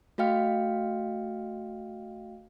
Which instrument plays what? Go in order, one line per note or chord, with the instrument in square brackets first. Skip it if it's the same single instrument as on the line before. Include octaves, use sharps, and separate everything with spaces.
[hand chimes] A3 F#4 D#5 F5 G5 F6